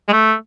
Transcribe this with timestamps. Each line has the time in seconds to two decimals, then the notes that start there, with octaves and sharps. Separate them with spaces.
0.08 G#3
0.12 A3